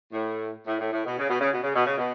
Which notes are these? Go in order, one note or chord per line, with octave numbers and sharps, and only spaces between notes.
A2
A2
A2
A2
B2
C#3
B2
C#3
B2
C#3
B2
C#3
B2